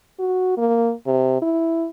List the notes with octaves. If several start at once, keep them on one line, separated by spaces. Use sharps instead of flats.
F#4
A#3
C3
E4